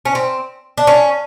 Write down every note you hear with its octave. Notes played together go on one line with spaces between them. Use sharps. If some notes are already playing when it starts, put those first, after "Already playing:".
C#4
C4
D4
C#4